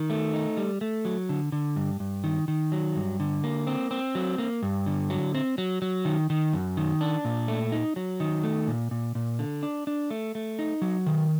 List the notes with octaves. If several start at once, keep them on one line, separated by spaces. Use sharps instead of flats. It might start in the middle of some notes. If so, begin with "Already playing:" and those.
Already playing: D#3
A3
D#4
G3
A3
F#3
D3
D3
G2
G2
D#3
D#3
F#3
G2
D3
A#3
C4
C4
F#3
A#3
G2
D3
F#3
C4
F#3
F#3
D#3
D#3
F#2
D#3
D4
A#2
A3
D#4
F#3
D#3
A3
A#2
A#2
A#2
D3
D4
D4
A3
A3
D#4
F#3
D#3